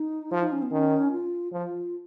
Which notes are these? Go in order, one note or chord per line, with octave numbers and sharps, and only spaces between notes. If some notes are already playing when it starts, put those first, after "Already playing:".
Already playing: D#4
F3 F4
D#4
C#4
B3
D#3 C#4
F4
F3 F4